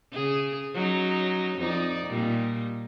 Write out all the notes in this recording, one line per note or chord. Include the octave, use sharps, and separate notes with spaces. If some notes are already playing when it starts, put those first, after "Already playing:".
C#3 G#4
F#3 C#4 D#4
F2 D#4 D5
A#2 G3 D#4